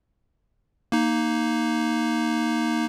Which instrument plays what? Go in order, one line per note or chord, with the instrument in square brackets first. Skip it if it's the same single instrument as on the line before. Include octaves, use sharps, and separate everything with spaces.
[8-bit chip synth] A#3 D#4